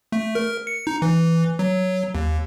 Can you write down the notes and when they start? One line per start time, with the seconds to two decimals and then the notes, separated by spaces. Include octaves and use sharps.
0.12 A3
0.35 A#4
0.67 C#7
0.87 D#4
1.02 E3
1.59 F#3
2.15 D#2